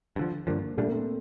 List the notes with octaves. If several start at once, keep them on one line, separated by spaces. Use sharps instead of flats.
G2
D3 F3
G2 D3 F3 A#3
A#2 G3 A3 D4
A#3
C4